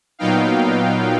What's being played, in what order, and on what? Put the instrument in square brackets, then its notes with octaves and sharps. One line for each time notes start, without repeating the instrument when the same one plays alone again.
[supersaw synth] A#2 F#3 B3 D#4 F5 G5